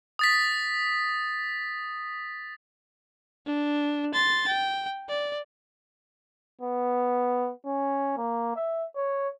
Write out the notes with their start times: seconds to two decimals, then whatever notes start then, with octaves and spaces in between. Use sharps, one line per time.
0.19 D#6 A6 B6
3.46 D4
4.14 C6 A6
4.47 G5
5.09 D5
6.61 B3
7.66 C#4
8.17 A#3
8.56 E5
8.96 C#5